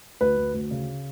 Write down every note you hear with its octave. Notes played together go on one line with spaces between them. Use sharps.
D2 B4
D2
D2
C#3